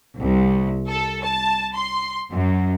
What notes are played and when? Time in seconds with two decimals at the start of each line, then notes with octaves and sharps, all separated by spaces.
0.19 C2
0.88 A4
1.24 A5
1.75 C6
2.30 F#2